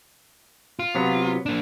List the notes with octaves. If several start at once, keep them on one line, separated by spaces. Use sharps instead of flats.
F4
C3 F#3 B3
A#3 D4